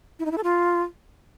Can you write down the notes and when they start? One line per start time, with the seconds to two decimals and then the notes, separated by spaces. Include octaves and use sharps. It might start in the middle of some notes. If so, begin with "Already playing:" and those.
0.19 E4
0.25 D#4
0.31 E4
0.37 A4
0.43 F4